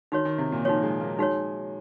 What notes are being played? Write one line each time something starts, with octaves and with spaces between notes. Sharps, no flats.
D#3 D#4 F#4 C#5
D#3
C3
A#2
F3 D#4 F#4 C#5
G#3
A#3
G#3 D#4 F#4 C#5